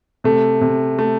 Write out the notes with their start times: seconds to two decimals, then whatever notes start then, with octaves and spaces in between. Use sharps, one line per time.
0.24 C3 A3
0.61 C3
0.99 A3